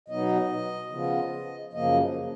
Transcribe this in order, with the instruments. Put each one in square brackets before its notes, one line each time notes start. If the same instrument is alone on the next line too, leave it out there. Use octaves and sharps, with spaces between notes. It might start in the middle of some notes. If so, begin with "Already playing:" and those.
[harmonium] B2 F#3 B3 D#4 D#5
C#3 F3 B3 F4
F#2 C#3 F3 A#3 D#5